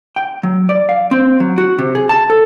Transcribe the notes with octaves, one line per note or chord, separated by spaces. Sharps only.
G5
F#3
D5
F5
C4
F#3
F#4
C3
G#4
A5
A4